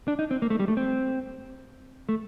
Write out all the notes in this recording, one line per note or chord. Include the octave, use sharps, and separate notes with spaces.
D4
D#4
C4
A#3
A3
G3
A3
C4
A3